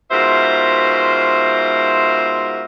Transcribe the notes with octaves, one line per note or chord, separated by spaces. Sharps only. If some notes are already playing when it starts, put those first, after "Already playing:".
G#2 B2 F4 A#4 C5 E5